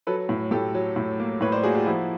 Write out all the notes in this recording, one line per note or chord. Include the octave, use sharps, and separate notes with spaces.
F#3 A4 B4
A2
A2 G4 A4
F#3
A2
A#3
A2 B4 C#5
C5 D5
A#3 F#4 G#4
F4 G4
F3 E4 F#4